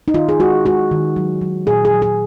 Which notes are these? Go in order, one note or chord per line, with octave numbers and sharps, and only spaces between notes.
D#4
D#3 F4
G#4
G#3 F#4
G#3 F#4
D#3
F#3
F#3
A#2 G#4
G#4
F#3
G#4